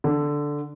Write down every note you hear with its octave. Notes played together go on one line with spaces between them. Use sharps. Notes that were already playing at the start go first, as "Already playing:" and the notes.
D3